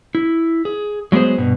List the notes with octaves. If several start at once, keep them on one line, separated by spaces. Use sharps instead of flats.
E4
G#4
F#3 G#3 B3 G#4 C5
G2 B2